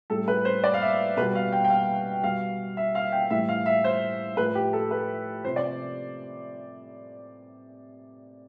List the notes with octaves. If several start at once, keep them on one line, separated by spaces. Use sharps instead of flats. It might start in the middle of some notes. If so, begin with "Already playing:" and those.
A2 G3 A4
B4
C5
D5
F5
E5
B2 B4
G3
F5
G5
G5
F5
B2 G3 F5
E5
F5
G5
A2 E3 G3 E5
F5
E5
C5
A2 F3 B4
G4
A4
B4
C3 F3 C5
D5